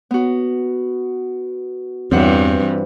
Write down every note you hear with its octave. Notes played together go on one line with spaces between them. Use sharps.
B3 F#4
E2 G2 E3 C4 B4 C5 F#5